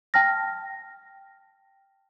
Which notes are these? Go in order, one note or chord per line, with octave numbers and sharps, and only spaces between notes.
G5 A5 F6 A#6